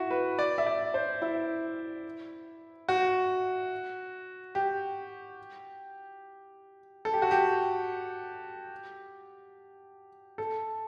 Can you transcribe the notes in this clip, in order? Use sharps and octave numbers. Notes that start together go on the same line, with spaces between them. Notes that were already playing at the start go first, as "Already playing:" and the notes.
Already playing: E4 F#4
B4
D5
E5
D5
C5
E4
F#4
G4
A4
G4
F#4
G4
A4